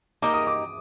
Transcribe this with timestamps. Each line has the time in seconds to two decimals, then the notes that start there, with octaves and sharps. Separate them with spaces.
0.22 A#3 D#4 G4 A#4 D#5 D6
0.34 D#6
0.47 D6